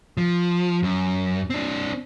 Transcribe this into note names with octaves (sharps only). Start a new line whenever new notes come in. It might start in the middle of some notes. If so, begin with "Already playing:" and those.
F3
F#2
C4 D4